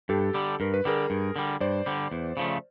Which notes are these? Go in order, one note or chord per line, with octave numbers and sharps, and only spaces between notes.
G2 G4 A4
D3 G3
G2 A#4
B4
D3 G3 G#4 A#4
G2
D3 G3
G2 C5 D5
D3 G3
E2
C#3 F3 A3